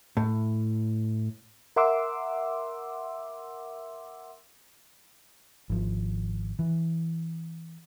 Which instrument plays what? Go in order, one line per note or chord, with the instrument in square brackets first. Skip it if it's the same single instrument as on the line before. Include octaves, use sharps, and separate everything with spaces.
[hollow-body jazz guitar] A2
[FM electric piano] A#4 E5 F#5 C6 D6 E6
[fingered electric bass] G#1 F3
E3